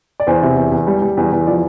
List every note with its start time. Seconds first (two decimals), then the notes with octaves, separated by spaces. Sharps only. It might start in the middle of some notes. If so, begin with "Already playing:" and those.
0.20 D5
0.27 E2 C5
0.43 C3
0.56 E2
0.72 E2
0.87 G3
1.02 G3
1.17 E2
1.32 E2
1.47 F3 D5